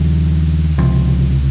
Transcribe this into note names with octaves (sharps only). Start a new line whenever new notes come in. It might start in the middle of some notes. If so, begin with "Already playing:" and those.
Already playing: D#2 C#3 F3
C#2 C3 F3